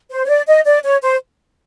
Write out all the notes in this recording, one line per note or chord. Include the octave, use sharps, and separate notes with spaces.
C5
C#5
D5
D#5
D5
C#5
C5